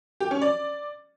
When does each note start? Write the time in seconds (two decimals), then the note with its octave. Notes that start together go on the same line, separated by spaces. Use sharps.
0.20 G4
0.31 C#4
0.42 D5